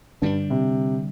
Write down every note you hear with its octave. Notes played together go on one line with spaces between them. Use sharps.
G2 D3 G3 D4
C3